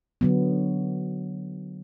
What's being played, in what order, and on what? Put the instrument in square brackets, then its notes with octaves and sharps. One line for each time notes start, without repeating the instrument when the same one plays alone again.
[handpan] D3 F#3 B3